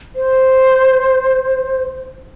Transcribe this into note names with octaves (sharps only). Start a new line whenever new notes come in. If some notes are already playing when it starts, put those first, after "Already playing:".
C5